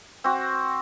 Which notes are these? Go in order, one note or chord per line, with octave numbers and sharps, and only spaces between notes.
C4 F#4